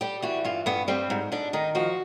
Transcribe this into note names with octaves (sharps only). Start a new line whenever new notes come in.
G3 G4
E3 F#4
G2 F4
G2 B3
G3 C4
G#2
G#2 D4
D#3 D#4
F3 F#4